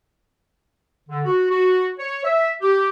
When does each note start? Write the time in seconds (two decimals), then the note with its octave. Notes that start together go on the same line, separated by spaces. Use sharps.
1.09 D3
1.25 F#4
1.50 F#4
1.98 C#5
2.25 E5
2.62 G4